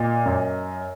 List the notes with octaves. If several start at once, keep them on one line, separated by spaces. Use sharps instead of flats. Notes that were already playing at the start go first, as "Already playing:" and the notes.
Already playing: A#2 D#5
F#2